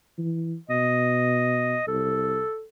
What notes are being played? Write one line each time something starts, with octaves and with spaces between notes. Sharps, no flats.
E3
B2 D#5
C2 A4